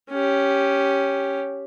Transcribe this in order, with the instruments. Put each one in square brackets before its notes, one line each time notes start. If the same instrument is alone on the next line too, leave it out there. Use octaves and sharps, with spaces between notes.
[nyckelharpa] C#4 G4